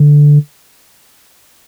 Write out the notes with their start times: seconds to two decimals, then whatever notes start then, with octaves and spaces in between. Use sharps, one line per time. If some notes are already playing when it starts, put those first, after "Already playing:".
Already playing: D3